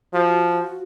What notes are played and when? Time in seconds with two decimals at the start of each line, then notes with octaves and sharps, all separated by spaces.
0.13 F3 F#4